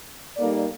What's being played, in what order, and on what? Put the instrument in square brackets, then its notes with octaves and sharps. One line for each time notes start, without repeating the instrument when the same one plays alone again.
[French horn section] G3 A#3 D#4 A4 D5